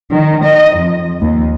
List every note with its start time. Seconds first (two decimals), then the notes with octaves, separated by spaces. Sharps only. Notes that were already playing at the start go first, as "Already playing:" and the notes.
0.13 D#3
0.46 D#5
0.76 F2
1.20 D#2